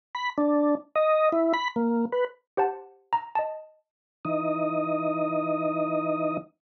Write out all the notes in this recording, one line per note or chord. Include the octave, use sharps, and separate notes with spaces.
B5
D4
D#5
E4
B5
A#3
B4
G4 C5 F#5 A5
A#5
D#5 A5
E3 D#4 D#5